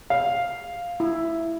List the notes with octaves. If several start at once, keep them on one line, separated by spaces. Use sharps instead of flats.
F5
E4